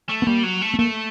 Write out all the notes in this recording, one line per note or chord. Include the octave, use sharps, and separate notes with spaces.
A3
B3
G3 A#3
F#3
A3
B3
A3 A#3